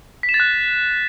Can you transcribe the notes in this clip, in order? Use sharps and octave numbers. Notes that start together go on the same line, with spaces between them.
B6
E7
A6
F#6